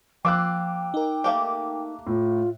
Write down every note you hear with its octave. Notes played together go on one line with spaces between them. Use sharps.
F3 A#3 C4 G5 D6 E6 F#6
D#4 A#4
A3 A#3 G4
A2 F4